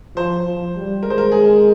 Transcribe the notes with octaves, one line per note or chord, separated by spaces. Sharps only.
F3 C5
F3
G3
G#3 A#4
C5
A#4
G#4